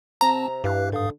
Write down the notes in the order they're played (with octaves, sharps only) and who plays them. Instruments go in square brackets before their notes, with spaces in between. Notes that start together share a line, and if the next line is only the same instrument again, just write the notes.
[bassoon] C3 [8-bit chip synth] C4 A5 [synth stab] A#5
[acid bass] G2 [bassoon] E3 [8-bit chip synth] G4 F5 F#6
[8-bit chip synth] G#2 F5 D#6 [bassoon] D3